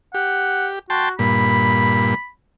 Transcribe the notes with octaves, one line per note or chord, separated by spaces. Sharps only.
G4 F#5
F#4 G5 A5 C6
G2 A#2 B5